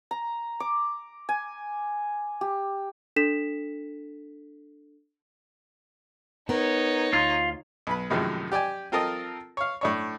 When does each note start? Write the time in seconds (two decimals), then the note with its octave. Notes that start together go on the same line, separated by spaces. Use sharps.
0.11 A#5
0.60 D6
1.29 G#5
2.41 G4
3.16 D4 A4 B6 E7
6.49 B3 D#4 A#4 C#5
7.13 D2 F4
7.87 B1 B4 B5
8.10 F#2 A2 C3 D#3 F3 G#3
8.52 G4 D5 G5 G#5
8.92 C4 F4 A4 A#4 D#5
9.57 C#5 F5
9.81 A2 D4 C#5